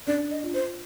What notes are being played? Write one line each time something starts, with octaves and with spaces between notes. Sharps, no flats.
D4 D5
D#5
F4
C5